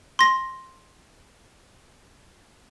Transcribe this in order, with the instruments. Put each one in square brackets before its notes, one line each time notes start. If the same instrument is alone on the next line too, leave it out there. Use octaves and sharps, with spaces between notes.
[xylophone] C6 A#6